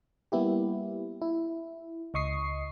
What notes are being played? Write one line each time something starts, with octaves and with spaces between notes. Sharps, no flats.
G3 A#3 B3 E4 G4
E4
C#2 D#5 C#6 D#6 C7